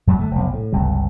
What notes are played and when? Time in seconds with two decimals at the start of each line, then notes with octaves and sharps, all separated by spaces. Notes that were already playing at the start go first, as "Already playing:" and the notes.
0.07 F#2 F#3 G3
0.19 D3 A3
0.31 F1 B1
0.54 A2
0.72 G1 C#2 C3 G3